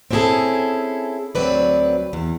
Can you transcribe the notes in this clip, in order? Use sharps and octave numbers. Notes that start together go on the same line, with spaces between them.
C4 C#4 E4 F#4 G#4 A4
D2 F#3 C4 B4 D5
E2